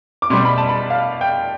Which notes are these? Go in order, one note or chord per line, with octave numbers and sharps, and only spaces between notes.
D6
B2 G3 C6
B5
A5
B5
F5
G5